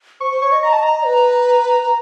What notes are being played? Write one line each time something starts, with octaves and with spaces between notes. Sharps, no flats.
C5 C#6
C5
C#5 C#6
D#5
D#5 A#5
A5
D#5 A#5
B4